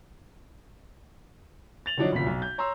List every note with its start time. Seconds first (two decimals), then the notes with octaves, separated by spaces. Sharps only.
1.86 A6 F7 F#7
1.97 D3 F3 F#3 D4 D#4
2.12 F1 D2 A#2 C#3 B6
2.26 B1
2.42 G6
2.58 C#5 A#5 C6 E6